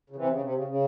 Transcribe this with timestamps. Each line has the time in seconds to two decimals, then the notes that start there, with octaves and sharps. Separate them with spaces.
0.10 C#3
0.16 C3 E3
0.30 C#3
0.42 C3
0.54 C#3
0.67 C#3